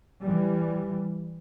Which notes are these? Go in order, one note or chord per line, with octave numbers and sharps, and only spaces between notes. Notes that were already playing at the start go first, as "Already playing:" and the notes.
E3 G3